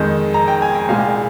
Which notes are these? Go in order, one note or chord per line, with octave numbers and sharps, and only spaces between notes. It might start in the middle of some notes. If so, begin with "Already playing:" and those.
Already playing: F2 D#3 G#3
A#5
G5
G#5
G5
C2 A#2 G#3 F5